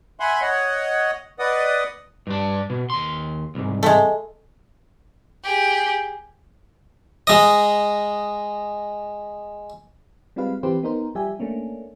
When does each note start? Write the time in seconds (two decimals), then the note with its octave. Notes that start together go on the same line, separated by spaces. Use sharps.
0.20 E5 F#5 G#5 B5 C6
0.41 C#5 D#5 F#5
1.39 B4 D5 D#5 F#5 D#6
2.27 G2 D4
2.70 B2
2.90 D#2 C6
3.55 C2 G#2
3.83 G#3 A3
5.43 G4 G#4
7.27 G#3 D#5
10.36 G3 G#3 C4 F4 B4 F5
10.63 E3 F3 C4 G4 B4 C5
10.83 B3 D#4 A#4 C5
11.15 F3 G3 G4 E5 G#5
11.39 A3 A#3 C#4 D4